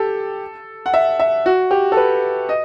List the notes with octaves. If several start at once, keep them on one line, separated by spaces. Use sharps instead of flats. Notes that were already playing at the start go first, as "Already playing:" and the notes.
Already playing: G4 A4
F#5
E5
E5
F#4
G4
A4
B4
D#5